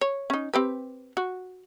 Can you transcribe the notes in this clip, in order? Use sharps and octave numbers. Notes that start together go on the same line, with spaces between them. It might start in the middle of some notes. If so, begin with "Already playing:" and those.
C#5
C#4 D#4
C4 G4 B4
F#4